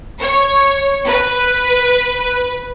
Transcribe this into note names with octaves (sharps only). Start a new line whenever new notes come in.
C#5
B4